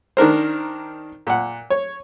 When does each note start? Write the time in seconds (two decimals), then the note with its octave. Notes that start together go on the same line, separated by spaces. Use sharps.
0.17 D#3 D4 A#4 C5
1.27 A#2 F#5
1.70 C#5